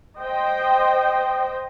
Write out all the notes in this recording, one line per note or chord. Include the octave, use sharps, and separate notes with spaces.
C5 D#5 G5